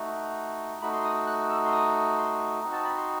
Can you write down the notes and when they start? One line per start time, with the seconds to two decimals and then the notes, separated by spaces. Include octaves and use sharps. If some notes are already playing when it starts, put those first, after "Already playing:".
Already playing: A3 D#4 F#4
0.81 A3 D#4 F#4 B5
0.93 C6
1.04 D#6
1.27 F#6
1.50 E6
1.65 C6
1.72 D#6
2.18 C6
2.64 C4 D#4 F#4
2.72 A5
2.85 B5
2.97 C6